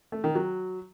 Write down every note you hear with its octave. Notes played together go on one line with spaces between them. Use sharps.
A3
D#3
F#3